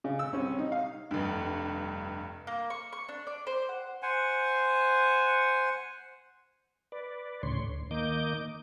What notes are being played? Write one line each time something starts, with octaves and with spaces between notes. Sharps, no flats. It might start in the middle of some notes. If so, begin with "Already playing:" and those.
C#3
E6
C2 C#4
D#4
F5
F1 G2
A#3
C#6
C#6
D4
D5
C5
F#5
C5 F#5 G#5
B4 D5
D2 A2 C#3 C#5 C6
D2
D#3 A#3 D#5 D6 G6